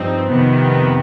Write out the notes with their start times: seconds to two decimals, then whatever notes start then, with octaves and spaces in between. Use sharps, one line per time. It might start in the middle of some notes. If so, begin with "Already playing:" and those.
Already playing: G2 F3 C4 D#4
0.28 F2 C3 D#3 B3